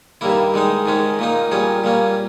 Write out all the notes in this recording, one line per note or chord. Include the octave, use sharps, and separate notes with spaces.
G2 D#3 G3 A#3 E4
D#3 G#3 D#4
G#2 D#3 G#3 C#4
A#2 A#3 D#4
A#2 G3 C#4 G#4
A#2 G3 A#3 C#4